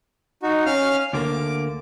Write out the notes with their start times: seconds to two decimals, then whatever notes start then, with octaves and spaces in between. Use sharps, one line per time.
0.43 D#4 F#4
0.66 C#4 F5 F6
1.13 D2 D3 A#3 D6